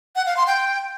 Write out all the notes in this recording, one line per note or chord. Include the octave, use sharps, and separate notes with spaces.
F#5
F5
C6
G5